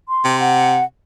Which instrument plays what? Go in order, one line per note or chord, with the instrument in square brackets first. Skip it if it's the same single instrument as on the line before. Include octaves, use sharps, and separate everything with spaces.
[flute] C6
[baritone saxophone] C3
[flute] F#5